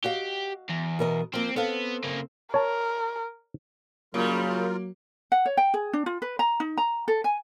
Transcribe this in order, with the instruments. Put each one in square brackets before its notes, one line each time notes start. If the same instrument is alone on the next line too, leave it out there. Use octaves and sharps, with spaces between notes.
[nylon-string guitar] F#4 D#5 F5 [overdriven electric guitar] G4
[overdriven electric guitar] E2
[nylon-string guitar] B2 A#4 D#5
[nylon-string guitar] F3 A#3 [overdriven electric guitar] C4
[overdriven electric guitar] B3 [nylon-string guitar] C4 A4 F5
[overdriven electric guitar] C#3 A#3
[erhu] A#4 [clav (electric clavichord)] C#5 A5
[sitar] C#3 G3 [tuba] F#3 [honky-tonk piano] A#3 [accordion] F4 A#4
[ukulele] F#5
C#5
G5
G#4
D4
F4
B4
A#5
D#4
A#5
A4
G#5